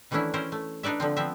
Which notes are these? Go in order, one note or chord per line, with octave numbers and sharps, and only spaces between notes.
D#3 E3 A3 C#4 D4 E4
C#4 E4 A#4 C5
A3
D4 D#4 B4 D5 E5
D3 F3 C4
F3 B3 C4 E5